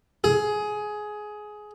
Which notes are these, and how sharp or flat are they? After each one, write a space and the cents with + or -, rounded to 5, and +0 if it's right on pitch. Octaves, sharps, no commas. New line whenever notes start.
G#4 +15